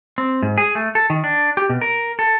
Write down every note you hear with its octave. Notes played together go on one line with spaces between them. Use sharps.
C4
G#2
G#4
A3
A4
D#3
D4
G4
B2
A#4
A4